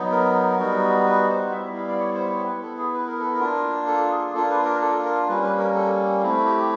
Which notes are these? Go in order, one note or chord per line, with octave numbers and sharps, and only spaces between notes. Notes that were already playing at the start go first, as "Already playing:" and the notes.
Already playing: F#3 B3 D#4
A#4
G3 B3 D#4 F#4
B4
C5
G3 B3 E4 E5
F5
D5
C#5
C5
C#5
B3 E4 B4
A4
G#4
B4
A#4
A4
A#4
A#3 D4 F4
A4
G#4
A#3 D4 F4 A4
B4
A#4
A4
A#4
G3 A#3 C#4 B4
B4
A#4
A4
A3 C4 E4
G4